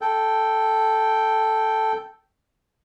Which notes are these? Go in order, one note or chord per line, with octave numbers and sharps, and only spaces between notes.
A4 G5